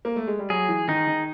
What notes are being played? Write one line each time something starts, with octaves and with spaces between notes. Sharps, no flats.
A#3
A3
G#3
G3
F#3 G#4
E3
D#3 D#4
D#3